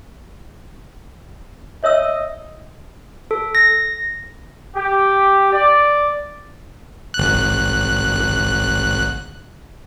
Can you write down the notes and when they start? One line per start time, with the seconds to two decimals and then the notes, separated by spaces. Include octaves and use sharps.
1.84 C#5 D#5 E5 E6
3.31 A4
3.55 A#6
4.75 G4
5.52 D5
7.14 G#1 F#6